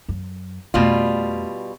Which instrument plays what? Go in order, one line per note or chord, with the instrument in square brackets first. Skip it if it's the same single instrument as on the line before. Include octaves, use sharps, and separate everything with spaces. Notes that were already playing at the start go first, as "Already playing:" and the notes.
[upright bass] F#2
[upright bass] F2 A3 [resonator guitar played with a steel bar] B2 G3 F4